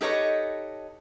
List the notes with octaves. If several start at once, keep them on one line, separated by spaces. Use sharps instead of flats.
D#4 G4 A4 B4 C#5 D#5